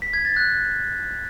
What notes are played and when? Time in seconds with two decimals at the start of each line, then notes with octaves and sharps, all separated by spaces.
0.02 B6
0.13 G#6
0.25 A6
0.36 F#6